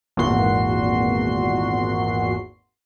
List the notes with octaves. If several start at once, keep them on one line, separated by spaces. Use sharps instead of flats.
G#1 E2 A#2 F#4 C6 C7